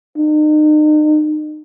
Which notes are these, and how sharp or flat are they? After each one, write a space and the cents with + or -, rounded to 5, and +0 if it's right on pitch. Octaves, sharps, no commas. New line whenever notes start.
D#4 -35